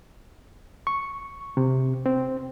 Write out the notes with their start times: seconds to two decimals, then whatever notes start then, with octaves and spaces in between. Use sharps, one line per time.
0.87 C#6
1.57 C3
2.06 C4